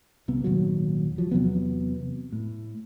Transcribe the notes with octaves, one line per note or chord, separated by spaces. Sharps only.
C2 C3 B3
D#1 G#1 D#2 F#3
F3 F#3
E2 C3 F#3 B3
A2